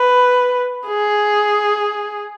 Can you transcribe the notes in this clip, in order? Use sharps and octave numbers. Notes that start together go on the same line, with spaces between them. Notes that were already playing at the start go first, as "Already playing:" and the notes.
Already playing: B4
G#4